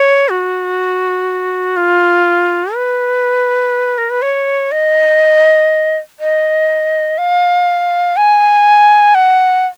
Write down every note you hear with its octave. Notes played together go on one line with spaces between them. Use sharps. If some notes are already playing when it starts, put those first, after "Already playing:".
Already playing: C#5
F#4
F4
B4
A#4
B4
C#5
D#5
D#5
F5
G#5
F#5